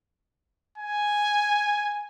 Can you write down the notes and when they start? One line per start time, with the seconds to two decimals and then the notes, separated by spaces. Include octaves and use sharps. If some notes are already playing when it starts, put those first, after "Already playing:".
0.78 G#5